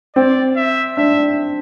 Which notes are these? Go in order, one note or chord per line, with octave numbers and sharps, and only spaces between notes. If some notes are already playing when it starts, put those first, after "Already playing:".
C4 D5
E5
D4 E5